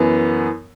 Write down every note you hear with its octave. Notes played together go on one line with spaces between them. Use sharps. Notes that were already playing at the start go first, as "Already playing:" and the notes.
Already playing: F#2 E3 B3